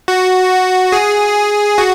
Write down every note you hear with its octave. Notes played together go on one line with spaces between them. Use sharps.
F#4
G#4
F#4